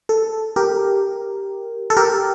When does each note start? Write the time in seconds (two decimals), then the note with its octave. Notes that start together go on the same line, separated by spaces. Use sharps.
0.09 A4
0.56 G4 A#4
1.90 A4
1.97 G4 A#4